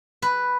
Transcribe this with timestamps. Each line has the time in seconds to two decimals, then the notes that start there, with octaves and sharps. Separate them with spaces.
0.22 B4